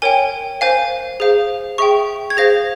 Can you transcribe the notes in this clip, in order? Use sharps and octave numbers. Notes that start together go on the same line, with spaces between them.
A#4 C#5 G5 G#5
C5 F5 G#5
G#4 C5 F5
G#4 E5 G5 C#6
G#6
G#4 C5 F5 A#6